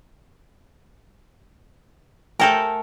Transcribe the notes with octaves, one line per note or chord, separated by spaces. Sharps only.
A3 A4 A#4 G5 G#5